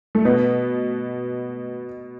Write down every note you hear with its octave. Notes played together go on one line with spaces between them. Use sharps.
A3
B2 B3